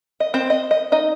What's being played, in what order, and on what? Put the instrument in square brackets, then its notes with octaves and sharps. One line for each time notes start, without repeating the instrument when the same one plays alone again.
[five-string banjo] D#5
C4 C5
D#5
D#5
D#4 D#5